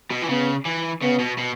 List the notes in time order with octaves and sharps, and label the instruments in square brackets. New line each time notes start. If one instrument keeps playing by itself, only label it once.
[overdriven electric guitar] B2
E3
[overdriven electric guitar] C#3 [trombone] B3
[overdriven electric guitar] E3
[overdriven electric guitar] C#3 [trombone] B3
[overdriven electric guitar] B2
B2